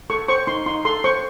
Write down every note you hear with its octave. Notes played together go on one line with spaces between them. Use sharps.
A4 C#6
C5 C#6
D#4 C6
D#4 C6
A4 C6
C5 C#6